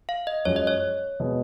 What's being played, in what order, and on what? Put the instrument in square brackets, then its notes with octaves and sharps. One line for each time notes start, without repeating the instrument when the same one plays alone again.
[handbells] F5
D#5
[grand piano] F#2 F3 G#3 [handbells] C#5
[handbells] D#5
C#5
[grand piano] B2 G#3 B3 F#4